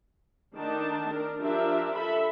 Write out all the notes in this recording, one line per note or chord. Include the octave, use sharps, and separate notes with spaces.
D#3 A3 D4 D#4 A5
D4 A#4
F3 D4 F4 G4 A#4 E5
A4 E5 B5